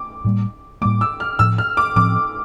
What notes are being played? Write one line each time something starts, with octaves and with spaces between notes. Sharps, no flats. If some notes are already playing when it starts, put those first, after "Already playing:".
Already playing: D6
A2 G3 A#3
A2 G3 A#3 D6
E6
F6
A2 F3 C4 E6
F6
D6
A2 F3 C4 D6